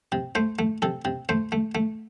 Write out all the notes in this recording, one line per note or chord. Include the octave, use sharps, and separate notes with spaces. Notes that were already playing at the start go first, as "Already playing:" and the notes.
C3
A3 C5
A3
C3 A4
C3
A3 C5
A3
A3